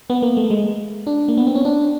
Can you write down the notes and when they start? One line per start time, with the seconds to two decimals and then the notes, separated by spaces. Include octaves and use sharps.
0.10 B3
0.22 A#3
0.37 A3
0.50 G#3
1.07 D4
1.28 A#3
1.37 B3
1.47 C4
1.55 C#4
1.65 D4